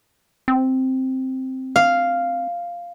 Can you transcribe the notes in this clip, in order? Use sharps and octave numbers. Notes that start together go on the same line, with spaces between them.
C4
F5